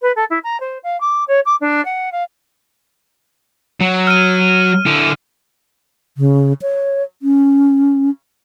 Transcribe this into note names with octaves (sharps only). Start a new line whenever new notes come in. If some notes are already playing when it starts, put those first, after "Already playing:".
B4
A4
E4
A#5
C5
F5
D6
C#5
D6
D4
F#5
F5
F#3
F6 D#7
D3 E4
C#3
C#5
C#4